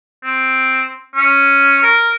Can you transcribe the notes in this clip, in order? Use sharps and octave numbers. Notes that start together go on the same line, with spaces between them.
C4
C#4
A#4